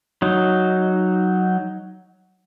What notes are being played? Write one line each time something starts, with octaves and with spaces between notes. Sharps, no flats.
F#3 D#4